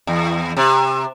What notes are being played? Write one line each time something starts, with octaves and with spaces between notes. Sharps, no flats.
E2
C3